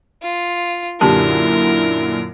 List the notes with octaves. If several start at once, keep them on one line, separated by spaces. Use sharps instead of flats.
F4
F#2 A#2 D3 E4 G4 A#4 A5